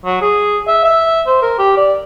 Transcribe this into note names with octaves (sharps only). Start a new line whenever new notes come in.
F#3
G#4
E5
E5
C5
A#4
G4
D5